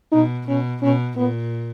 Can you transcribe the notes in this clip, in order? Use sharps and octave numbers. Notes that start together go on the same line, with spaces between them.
B2 D#4
B2 C#4
B2 C#4
A#2 B3